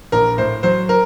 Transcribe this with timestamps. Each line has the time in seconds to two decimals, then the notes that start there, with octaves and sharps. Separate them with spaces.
0.12 A#1 A#4
0.38 A2 C5
0.63 F#3 C5
0.89 A#4